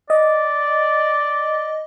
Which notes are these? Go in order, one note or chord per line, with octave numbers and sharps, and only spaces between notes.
D5 D#5